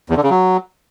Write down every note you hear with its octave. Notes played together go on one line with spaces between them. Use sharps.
E2
D3
C#3
F#3